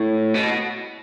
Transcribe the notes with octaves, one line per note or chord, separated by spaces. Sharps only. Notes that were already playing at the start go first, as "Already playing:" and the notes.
Already playing: A2
B2